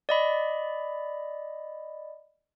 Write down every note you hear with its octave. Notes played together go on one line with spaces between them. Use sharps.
D5 D#5 B5